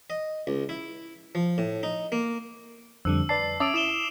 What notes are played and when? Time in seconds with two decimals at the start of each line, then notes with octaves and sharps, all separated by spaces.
0.10 D#5
0.47 C#2
0.69 E4
1.35 F3
1.58 A2
1.83 D#4
2.12 A#3
3.05 F2 D3 G3 E6
3.29 B4 D5 A5 C7
3.60 C#4 E5 A5 D6 D#6 D7
3.74 E4 D#6 E7 G7